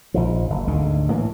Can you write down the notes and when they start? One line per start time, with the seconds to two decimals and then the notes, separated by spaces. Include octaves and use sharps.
0.14 A#1 D#3 F3
0.50 F#1
0.67 G#1 D2 D3 D#3
1.10 A2 E3 A#3